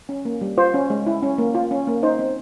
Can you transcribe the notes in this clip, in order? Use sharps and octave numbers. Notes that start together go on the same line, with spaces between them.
C#4
A#3
G3
F4 C5
C#4
G#3
E4
C#4
A#3
F4
C#4
A#3
D#4 C5
C4